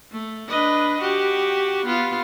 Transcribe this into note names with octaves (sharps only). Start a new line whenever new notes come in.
A3
D4 B4 D#5
F#4 G4
B3 F4